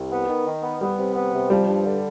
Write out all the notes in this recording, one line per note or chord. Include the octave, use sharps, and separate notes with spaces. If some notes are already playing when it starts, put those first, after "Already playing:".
Already playing: C2
B3
D#3
D#3
B3
G3 B3
C3
B3
C3
F3 G3
G2
D3